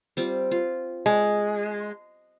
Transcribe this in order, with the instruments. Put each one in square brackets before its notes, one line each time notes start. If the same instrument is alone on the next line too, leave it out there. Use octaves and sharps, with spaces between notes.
[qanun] G3 C4 F4
F4
[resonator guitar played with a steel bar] G#3